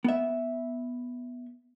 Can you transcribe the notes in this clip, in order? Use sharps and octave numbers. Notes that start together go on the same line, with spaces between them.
B3 E5